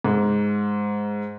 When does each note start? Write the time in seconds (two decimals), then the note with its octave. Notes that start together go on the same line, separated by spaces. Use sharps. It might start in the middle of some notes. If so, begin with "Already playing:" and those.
0.04 G#2